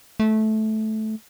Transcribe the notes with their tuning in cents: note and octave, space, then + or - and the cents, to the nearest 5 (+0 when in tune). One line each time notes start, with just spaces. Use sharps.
A3 -15